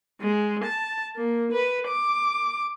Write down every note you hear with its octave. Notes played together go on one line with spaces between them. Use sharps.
G#3
A5
A#3
B4
D6